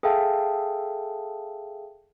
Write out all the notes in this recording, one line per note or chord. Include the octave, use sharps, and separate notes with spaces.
G#4 A4 E5 F5 G5 A5